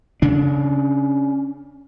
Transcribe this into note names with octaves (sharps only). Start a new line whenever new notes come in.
C#3 D4